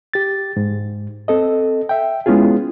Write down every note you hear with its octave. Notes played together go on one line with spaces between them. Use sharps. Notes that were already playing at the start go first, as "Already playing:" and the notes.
G4 A6
G#2
C4 A4 D#5
E5 G5
G#3 B3 C#4 E4 F4 G#4